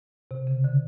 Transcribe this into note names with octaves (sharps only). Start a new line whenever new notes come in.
C3
C#3
D3